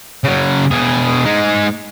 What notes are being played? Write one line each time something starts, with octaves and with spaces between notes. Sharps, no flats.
C#3 F#3
B2 G#4
G#3 D#4